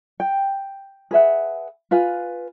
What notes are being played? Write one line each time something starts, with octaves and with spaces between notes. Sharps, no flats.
G5
G#4 B4 E5 F#5
F4 B4 F5 G#5